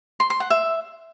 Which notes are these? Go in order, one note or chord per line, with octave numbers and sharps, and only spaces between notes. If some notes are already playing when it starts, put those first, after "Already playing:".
C6
C6
F#5
E5